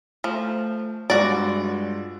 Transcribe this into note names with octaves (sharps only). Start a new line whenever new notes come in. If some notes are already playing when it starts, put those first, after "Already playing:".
F3 A3
G2 G#3 F4 F#4 D5